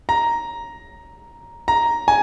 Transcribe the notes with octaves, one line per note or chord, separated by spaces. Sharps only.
A#5
A#5
G#5